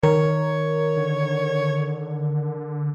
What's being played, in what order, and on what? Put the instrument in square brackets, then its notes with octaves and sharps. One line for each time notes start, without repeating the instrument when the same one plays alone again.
[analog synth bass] D#3 [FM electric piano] A#4 [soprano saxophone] C#5
[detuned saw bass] D3